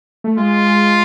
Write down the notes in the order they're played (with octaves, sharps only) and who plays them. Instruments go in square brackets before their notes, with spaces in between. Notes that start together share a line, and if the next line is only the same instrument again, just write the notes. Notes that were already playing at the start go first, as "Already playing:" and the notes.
[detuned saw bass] A3
[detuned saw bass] G#3 [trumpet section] F4